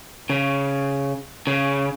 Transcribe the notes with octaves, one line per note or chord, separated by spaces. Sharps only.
C#3
C#3